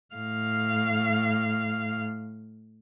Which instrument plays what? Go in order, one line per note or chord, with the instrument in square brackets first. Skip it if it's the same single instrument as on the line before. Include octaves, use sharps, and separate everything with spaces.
[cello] A2 F5